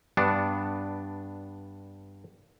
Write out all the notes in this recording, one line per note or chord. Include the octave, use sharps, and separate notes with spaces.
G2 B3 D4